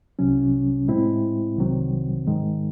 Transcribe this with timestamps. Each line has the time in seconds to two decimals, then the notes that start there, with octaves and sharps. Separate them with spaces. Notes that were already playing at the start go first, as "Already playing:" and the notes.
0.19 C2 C3 F#3 C#4
0.88 A2 G#3 C4 E4
1.57 C2 C3 D#3 F#3 C4
2.27 G#2 D#3 G#3